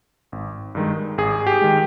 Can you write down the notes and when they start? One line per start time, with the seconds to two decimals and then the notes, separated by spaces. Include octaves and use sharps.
0.32 G#1
0.75 G2 D#3 G#3
1.18 G#1 G#4
1.47 G4
1.61 D#3 G#3